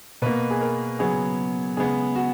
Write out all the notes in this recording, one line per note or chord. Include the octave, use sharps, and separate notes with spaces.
B2 A#3 B4
G#4
A#4
C#3 F#3 B3 G#4
C#3 G#3 B3 G#4
F#4